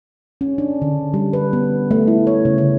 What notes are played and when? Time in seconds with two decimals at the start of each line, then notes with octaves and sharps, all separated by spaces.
0.41 C#4
0.58 D4
0.82 D3
1.14 G3
1.33 B4
1.53 B3
1.91 A3
2.08 E4
2.27 C#5
2.45 C#3
2.58 C#5